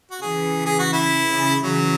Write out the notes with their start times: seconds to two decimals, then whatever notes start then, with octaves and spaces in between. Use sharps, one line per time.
0.11 F#4
0.21 C#3 E3 G#4
0.66 G#4
0.79 F#4
0.92 E4
1.28 C#3
1.63 C#3 E3 F#3